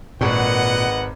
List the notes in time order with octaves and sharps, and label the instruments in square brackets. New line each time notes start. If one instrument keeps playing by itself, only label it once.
[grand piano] G#1 C#6 [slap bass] A#2 [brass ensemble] B4 D#5 F#5